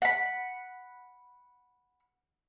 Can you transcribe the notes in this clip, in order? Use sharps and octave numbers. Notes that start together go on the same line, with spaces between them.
F#5 B5